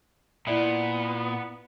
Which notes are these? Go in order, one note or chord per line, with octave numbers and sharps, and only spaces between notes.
A#2 B3 E4 D5 E5